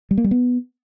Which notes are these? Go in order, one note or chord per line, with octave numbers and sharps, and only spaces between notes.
G3
A#3
G3
B3